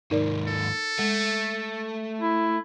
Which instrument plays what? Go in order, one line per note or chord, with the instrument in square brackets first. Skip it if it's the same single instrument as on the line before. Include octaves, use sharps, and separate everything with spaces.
[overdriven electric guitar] D#2 G#2 [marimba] D#4 A#4 D5
[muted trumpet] A4
[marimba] G#3 [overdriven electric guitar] A3
[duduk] E4